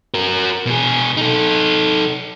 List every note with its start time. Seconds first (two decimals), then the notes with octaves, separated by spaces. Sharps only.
0.14 F#4 A#4
0.66 B2 G#4
1.17 D#4 A4